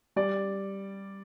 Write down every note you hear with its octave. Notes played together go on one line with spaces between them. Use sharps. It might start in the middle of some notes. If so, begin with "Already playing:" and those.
G3 D5